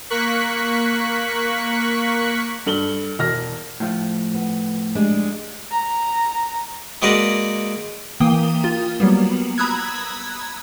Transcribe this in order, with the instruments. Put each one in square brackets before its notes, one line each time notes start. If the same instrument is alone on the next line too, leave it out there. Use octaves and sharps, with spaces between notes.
[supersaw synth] A#3 C#6 F#6 B6
[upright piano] G2 A4 F#7 G7
E1 F6 A#6
[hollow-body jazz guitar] A2 F3
[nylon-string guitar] B3
G3 G#3 D4
[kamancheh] A#5
[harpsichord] G#3 A#3 F#4 A#4 B4 D5
[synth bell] E3 A#3 G5 D#6 G7
F4
F#3 G3 A#3 B3
A#5 B5 D#6 E6 F#6 G#6